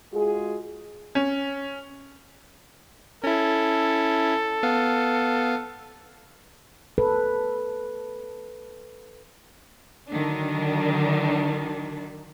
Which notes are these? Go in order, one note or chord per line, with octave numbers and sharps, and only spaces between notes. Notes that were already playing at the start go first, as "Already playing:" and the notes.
G#3 F4 F#4 G#4
C#4
C#4 E4 A4
B3 F5
A4 B4
D3 D#3 F#3 D4